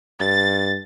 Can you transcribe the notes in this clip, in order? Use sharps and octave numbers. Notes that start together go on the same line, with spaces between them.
G2 A6